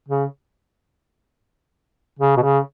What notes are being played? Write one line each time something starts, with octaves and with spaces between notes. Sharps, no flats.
C#3
C#3
B2
C#3